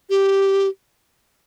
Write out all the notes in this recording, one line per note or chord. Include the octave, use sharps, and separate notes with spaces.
G4